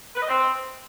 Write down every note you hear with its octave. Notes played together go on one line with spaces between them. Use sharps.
B4
D#5
C4